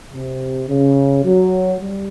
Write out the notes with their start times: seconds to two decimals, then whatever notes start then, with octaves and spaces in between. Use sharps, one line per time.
0.13 C3
0.69 C#3
1.24 F#3
1.80 G3